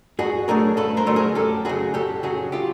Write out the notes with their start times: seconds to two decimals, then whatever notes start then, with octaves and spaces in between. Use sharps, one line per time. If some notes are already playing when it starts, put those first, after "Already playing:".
0.19 G2 F#4 G#4
0.48 D3 F#3 A3 G#4 A#4
0.77 G2 A4 B4
0.97 A#4 C5
1.06 D3 F#3 A3
1.16 G#4 A#4
1.35 F#2 G4 A4
1.65 C#3 F#3 F#4 G#4
1.94 F#2 G4 A4
2.23 C#3 F#3 F#4 G#4
2.52 F4 G4